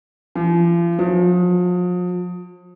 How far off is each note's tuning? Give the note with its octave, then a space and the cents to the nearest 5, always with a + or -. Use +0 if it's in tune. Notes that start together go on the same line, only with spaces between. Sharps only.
F3 -40
F3 +40